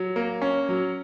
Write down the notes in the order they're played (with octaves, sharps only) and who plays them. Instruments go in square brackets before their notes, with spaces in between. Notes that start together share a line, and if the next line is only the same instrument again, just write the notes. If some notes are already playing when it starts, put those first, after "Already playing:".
Already playing: [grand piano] F#3
A#3
C#4
F#3